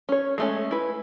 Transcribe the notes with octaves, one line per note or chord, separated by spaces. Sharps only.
C#4 C#5
G#3 A3 C#4
E4 B4